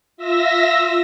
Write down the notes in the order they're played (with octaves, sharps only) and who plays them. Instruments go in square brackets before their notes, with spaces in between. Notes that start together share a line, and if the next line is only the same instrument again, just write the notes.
[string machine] F4 E5 E6 A#6